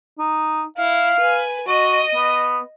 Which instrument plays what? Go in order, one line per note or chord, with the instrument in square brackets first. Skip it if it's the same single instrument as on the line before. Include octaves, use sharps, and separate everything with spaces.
[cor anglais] D#4
[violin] E4 [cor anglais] F5
[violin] B4 G#5
[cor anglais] F#4 [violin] D#5 D#7
[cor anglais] B3